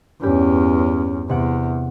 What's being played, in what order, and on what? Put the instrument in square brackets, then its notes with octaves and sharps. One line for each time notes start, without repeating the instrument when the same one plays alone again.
[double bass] E2 [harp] G2 G4 [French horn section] C#4
[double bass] E2 [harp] C3 F#5 D7